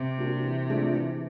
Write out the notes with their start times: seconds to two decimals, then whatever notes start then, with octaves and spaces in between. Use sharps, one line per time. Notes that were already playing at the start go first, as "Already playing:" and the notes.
Already playing: C3
0.18 G3 A#3 D4 F#4
0.44 E3
0.70 A3 D4 F4 G#4
0.96 E3